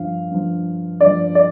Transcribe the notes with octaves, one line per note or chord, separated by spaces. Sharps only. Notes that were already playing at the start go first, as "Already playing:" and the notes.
Already playing: G2 F3 F5
G2 F3
G2 F3 D5
D5